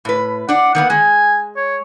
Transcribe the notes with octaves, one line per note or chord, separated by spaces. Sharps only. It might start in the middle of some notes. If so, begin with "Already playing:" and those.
A2 B4
D4 D5 F#5
D#3 A#3 B3 F#5
G#3 G#5
C#5